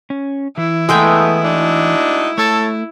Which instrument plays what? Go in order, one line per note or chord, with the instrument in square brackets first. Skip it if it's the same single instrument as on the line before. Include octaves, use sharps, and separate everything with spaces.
[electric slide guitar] C#4
[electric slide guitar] E3 [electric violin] E4
[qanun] G#3 A3 G5 [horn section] B3
[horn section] D4 D#4 F#4
[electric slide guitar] A3 [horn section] A4 C#5 A5